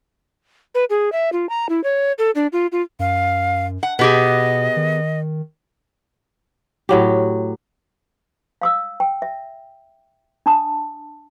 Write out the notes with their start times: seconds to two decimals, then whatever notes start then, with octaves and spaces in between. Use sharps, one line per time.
0.75 B4
0.90 G#4
1.12 E5
1.32 F4
1.49 A#5
1.69 E4
1.84 C#5
2.18 A4
2.35 D4
2.52 F4
2.72 F4
2.99 F#2 F5
3.83 F#5
3.99 B2 B3 G4 G#4 D#5
4.76 D#3
6.89 A2 F#3 G4
8.62 F5 D#6 E6
9.00 G5
9.22 E5
10.46 D4 A5 D#6